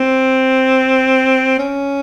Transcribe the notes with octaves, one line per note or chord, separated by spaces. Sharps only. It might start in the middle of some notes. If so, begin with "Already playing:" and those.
Already playing: C4
C#4